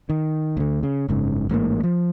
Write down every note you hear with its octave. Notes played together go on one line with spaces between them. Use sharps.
D#3
D2 D3
C#3
F#1 G#2 C#3
A1 G#2 C3 A#3
F3